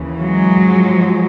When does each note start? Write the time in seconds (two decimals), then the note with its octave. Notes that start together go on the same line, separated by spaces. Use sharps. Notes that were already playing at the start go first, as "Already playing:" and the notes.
Already playing: D#2 C#3 E3
0.22 F#3 G#3
0.61 G#2 F3